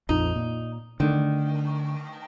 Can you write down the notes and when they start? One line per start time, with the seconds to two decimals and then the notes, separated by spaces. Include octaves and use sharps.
0.09 A#1 F2 F3 D#4
0.36 A#2
1.00 D3 D#3 A3